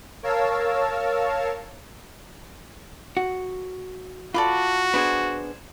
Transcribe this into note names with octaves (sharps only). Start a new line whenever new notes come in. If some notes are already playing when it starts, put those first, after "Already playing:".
A#4 C#5 F5 A5 E6
F#4
F4 F#4 A4 D5 B5
B3 D4 G#4 C5 G#5